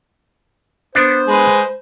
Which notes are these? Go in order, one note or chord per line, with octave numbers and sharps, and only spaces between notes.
B3 D4 C5
G#3 G#4 B4